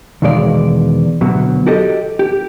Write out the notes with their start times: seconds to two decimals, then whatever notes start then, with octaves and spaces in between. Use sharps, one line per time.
0.22 E2 B2 D#3 G#3 D5 F5
1.21 D2 B2 F#3
1.66 F#4 G4 A4 D#5
2.19 G4